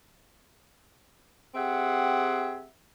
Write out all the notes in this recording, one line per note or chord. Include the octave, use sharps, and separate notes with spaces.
C4 G4 G#4 E5 F#5